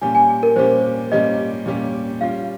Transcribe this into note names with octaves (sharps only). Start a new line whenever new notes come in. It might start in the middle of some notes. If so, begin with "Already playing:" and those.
A#2 G3 C#4 G4 G#5
G#5
A#4
A#2 G3 C#4 G4 C5
A#2 G3 C#4 G4 D#5
A#2 G3 C#4 G4
G3 C#4 F4 F5